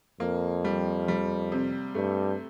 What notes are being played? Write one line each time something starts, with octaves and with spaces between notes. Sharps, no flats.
F2 A#3
G3
G3
C3
G2 A3